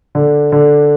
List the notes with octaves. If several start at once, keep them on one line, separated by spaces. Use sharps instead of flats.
D3
D3